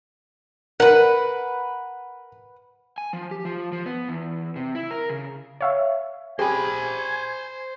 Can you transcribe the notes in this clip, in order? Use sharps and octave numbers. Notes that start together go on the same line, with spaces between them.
A#4 B4 F#5
G#5
F3
G4
F3
F3
B3
E2
C3
E4
A#4
C#3
C#5 E5 F5
G4 G#4 C5 G#5 B5